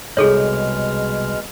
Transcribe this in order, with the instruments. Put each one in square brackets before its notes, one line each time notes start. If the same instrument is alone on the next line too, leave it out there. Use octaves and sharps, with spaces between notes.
[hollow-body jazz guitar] C2 F#2 [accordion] B2 G#3 F6 [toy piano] G#4 A4 C#5